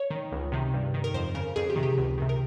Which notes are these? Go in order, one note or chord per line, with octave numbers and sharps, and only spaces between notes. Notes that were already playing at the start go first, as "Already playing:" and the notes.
Already playing: C#5
D#3
C#2
C3 D#3
G2
D#3
A#4
F2 C5
C#3 A#4
F2 G#4
G4
C3 D#3
G4
C#2
C3 D#3
A#4